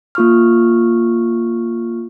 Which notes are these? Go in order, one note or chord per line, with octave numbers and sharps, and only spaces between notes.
A#3 F4 C#6 F6